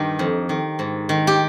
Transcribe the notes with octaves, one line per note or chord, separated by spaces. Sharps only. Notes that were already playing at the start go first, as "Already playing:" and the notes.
Already playing: G2 D#3 D#4 G4
F2
D#3
G#2
D#3
G4